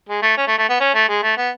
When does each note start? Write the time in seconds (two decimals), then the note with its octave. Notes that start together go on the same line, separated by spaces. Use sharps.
0.09 G#3
0.22 A3
0.37 C#4
0.48 A3
0.58 A3
0.69 B3
0.80 C#4
0.95 A3
1.08 G#3
1.23 A3
1.37 B3